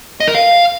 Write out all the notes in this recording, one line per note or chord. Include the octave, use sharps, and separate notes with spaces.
D#5
A#4
F5